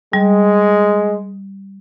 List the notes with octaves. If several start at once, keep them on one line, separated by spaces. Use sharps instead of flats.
G3 G#3